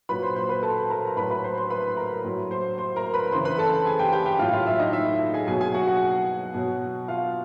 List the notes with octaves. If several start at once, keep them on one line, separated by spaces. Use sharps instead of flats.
A#2 F#3 B4 B5
C5 C6
C5 C6
B4 B5
A4 A5
A#4 A#5
A#5
A2 F#3 B4 B5
B4 B5
C5 C6
C5 C6
B4 B5
A#4 A#5
A2 F#3
C5 C6
C5 C6
A#4 A#5
B4 B5
C#3 E3 C5 C6
B4 B5
A4 A5
G#4 G#5
G4 G5
G4 G5
G4 G5
A2 F#3 F4 F5
F4 F5
E4 E5
D#4 D#5
E4 E5
G#4 G#5
B2 F#3 G#4 G#5
G#4 G#5
F#4 F#5
F#4 F#5
B2 F#3
F4 F5